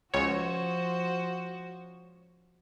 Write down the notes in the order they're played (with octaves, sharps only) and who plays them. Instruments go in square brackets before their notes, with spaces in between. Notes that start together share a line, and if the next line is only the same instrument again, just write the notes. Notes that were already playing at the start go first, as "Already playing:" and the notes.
[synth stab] C#2 C#5 [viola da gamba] F3 F#4 C5